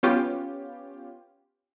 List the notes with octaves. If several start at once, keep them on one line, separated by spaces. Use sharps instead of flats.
B3 C#4 F4 G4